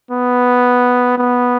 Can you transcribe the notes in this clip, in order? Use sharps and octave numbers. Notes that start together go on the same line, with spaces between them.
B3
B3